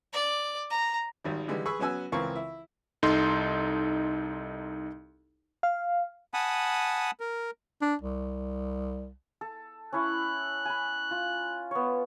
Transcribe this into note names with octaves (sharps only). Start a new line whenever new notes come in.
D5
A#5
G#1 D#3 G3
D3 E3 G3 G#3
G#4 B4 C#6 E6
F#3 B3 C#4 F#4 G#5 E6
C#2 E3 C4 A#4 F5 C#6
E4
C2 D#4 A4 C6
F5
F#5 G#5 A5 B5 D#6
A#4
D4
C2
A4
C#4 E4 C#5 F#6
G#5 B5
F4
B3 C#5